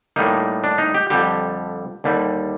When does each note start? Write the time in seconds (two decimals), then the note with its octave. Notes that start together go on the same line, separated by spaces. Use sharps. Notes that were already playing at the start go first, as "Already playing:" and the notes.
0.16 A2 G3 A#3 D#4
0.64 D4
0.78 D#4
0.94 G4
1.10 F2 D3 G3 G4
2.04 D#2 D3 G3